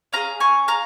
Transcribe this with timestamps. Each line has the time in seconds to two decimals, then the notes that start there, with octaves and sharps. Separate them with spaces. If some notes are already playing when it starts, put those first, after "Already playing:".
0.13 C#4 F4 G#4 F5 A#5
0.40 G#5 C#6
0.68 F5 A#5